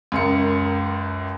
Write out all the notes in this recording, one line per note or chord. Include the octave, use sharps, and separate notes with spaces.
C#2 F#2 A#4 C#7